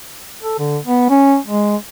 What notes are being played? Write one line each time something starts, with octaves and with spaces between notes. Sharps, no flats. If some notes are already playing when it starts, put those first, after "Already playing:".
A4
D3
B3
C#4
G#3